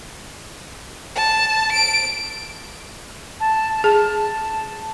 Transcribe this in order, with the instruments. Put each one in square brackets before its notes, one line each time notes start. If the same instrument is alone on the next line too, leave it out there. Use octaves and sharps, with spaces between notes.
[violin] A5
D7
[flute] A5
[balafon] G#4 [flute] A5